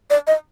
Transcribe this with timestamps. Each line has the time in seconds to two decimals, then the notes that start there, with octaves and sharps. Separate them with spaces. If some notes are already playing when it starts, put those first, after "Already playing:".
0.10 D5
0.27 D#5